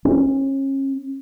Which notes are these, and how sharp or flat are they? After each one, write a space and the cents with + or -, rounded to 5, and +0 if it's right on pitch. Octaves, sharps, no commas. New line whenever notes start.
C#4 -35